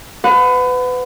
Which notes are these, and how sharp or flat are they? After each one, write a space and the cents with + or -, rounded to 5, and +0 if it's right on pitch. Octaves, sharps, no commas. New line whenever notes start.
B4 +30 F#5 -25